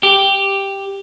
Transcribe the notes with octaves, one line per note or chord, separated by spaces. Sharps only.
G4